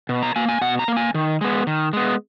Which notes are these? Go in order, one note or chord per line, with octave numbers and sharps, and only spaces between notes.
B2
A#5
A#3 G#5
G#5
B2 F#5
A#5
A#3
G#5
D#3
G#3 B3
D#3
G#3 B3